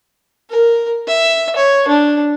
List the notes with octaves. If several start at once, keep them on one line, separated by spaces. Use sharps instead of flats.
A#4
E5
C#5
D4